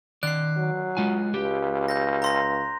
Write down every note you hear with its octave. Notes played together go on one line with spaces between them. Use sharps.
D#3 D5 F#6 C7
F#3
G#3 F4 G#5
C#2 G4
G6 A#6
A#5 C6 A#6